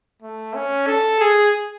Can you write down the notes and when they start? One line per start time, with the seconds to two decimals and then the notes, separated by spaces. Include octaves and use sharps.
0.22 A3
0.54 C#4
0.87 A4
1.20 G#4